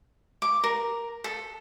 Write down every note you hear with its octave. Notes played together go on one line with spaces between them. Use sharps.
D6
A#4
A4